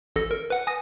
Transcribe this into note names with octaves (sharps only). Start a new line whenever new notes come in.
A1 A4 A#6
A#4
B4 F#5
G#5 D#6 A#6